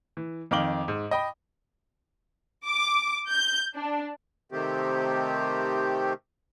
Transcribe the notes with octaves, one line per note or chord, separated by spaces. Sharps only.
E3
F2 D#3 F5 D6 F#7 G7
G#2
D#5 G5 B5
D6
G6
D4
C3 D#3 A3 C4 G4